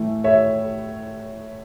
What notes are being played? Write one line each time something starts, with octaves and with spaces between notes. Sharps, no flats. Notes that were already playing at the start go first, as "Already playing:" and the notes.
Already playing: A2 E3 A3
C#5 E5